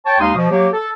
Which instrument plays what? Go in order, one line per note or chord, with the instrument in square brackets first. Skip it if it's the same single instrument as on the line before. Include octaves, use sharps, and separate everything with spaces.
[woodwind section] C#5 G5 A5
D#2 G#3 D#4 F5 C6 D#6
B2 F3
F#3 A#3 G4
A4